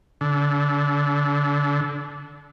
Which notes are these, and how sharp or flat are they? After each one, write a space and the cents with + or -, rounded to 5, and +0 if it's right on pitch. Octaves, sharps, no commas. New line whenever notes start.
D3 -30